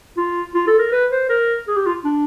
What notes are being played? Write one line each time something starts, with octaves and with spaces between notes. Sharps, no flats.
F4
F4
A4
A#4
B4
C5
A#4
G#4
G4
F4
D4